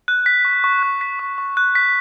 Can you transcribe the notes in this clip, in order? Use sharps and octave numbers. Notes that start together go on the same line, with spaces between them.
F#6
B6
C#6
C#6
F#6
B6
C#6
C#6
F#6
B6